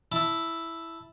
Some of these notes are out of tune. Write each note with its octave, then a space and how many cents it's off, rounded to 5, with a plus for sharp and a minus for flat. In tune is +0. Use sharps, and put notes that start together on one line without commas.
E4 +0 A5 +0